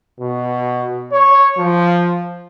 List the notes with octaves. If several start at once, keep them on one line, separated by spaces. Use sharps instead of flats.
B2
C#5
F3